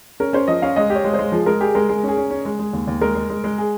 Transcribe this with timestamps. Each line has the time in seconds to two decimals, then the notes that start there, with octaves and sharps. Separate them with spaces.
0.20 C#4 A#4
0.33 C#4 C5
0.47 F3 D#5
0.62 C#4 F5
0.76 G#3 D#5
0.90 G4
0.95 C#5
1.04 G#3
1.14 C5
1.19 G#3
1.32 F3 G#4
1.46 G#3 A#4
1.61 G4 G#4
1.75 G#3 A#4
1.89 G#3 G#4
2.03 C#4 G#4
2.17 C#4
2.31 C#4
2.45 G#3
2.59 G#3
2.73 D#2
2.87 D#2
3.01 G#3 A#4
3.15 G#3
3.30 G#3
3.44 G#3
3.58 G#4